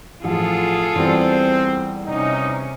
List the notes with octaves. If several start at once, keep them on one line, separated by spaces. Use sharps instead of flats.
A1 F3 F4 G#4 A4
E2 G3 C4
C3 C#4 D#4